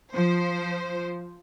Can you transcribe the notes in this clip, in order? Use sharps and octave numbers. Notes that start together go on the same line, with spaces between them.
F3 C5